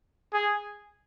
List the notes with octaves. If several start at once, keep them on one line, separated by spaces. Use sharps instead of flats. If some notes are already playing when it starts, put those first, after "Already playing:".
G#4